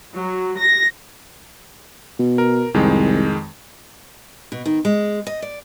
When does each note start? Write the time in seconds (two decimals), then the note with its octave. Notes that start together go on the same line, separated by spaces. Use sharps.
0.18 F#3
0.58 A#6
2.20 B2
2.38 A#4
2.74 C2 F2 D#3 G#3
4.52 B2
4.66 D#3
4.85 G#3
5.27 D#5
5.42 D5